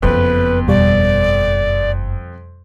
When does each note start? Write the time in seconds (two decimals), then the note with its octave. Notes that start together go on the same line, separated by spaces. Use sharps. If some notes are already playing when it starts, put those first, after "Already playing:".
0.02 F#1 F2 B3 B4
0.68 E2 B2 G3 D5